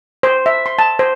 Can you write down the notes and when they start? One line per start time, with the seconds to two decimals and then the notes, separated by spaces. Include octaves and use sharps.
0.23 C5
0.46 E5
0.66 C6
0.79 A5
0.99 C5